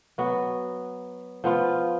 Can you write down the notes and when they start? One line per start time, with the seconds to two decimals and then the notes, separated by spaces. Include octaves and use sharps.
0.18 F#3 B3 F#4
1.44 F3 B3 F4